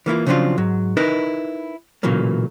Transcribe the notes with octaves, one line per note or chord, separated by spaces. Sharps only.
E3 A#3 E4 F4
C#3 F3 F#3 C4 D4 F4
G#2 F#3
D#4 E4 A#4 B4 D#5
B1 A#2 C#3 E3 F#3 A#3